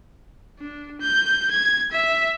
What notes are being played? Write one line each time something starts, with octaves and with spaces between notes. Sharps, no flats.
D4
G6
G#6
E5